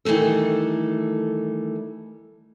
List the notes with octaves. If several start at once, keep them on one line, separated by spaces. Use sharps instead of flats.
D#3 E3 G3 A3 A4